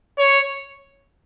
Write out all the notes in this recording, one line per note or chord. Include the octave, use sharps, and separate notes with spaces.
C#5